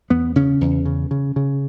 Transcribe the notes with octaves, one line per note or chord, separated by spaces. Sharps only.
E2 B3
C#3 C#4
E2
C#3
C#3
C#3